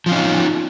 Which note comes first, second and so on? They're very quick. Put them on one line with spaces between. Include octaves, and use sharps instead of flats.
F3 F4 C#4 D#4